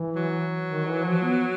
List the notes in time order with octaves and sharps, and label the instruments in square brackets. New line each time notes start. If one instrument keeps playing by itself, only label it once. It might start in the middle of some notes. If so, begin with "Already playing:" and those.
Already playing: [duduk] E3
[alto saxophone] F#3
[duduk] D#3
E3
F3
B3